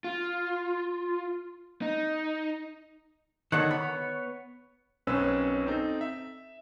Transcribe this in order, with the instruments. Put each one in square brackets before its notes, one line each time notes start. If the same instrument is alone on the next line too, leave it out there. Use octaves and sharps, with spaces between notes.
[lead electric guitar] F4
D#4
[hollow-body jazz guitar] D3 D#3 [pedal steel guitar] A4 C#5 F#5
[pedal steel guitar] B3 C#5 [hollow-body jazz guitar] B5
[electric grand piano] B1 F#2 C4 C#4 B4 E6
C4 D#4 A4
E5